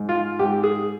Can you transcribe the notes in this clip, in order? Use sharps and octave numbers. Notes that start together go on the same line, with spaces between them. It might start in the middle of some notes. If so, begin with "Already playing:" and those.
Already playing: G#2
F4
G#2 G4
G#4